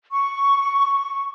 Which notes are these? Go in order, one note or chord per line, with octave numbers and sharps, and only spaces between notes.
C#6